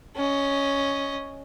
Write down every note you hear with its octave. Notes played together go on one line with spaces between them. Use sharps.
C#4 D#5